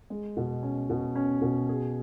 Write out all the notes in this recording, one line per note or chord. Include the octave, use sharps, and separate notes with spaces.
G#3
B2
C#4
B2
C#4
B2
G#4